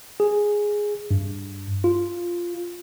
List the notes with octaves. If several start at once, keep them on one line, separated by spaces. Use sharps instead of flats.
G#4
G2
F4